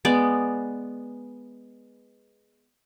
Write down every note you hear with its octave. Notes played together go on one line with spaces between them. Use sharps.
G#3 B3 D5